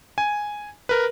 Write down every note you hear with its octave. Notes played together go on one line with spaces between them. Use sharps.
G#5
A#4 B4